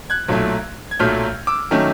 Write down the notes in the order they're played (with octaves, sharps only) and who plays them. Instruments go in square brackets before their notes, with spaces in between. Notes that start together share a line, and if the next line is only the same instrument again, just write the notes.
[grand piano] F#6 G#6
B1 A#2 F#3 A3
G#6
B1 A#2 F#3 A3 F6 G6
D6 E6
D#3 F#3 A3 C#4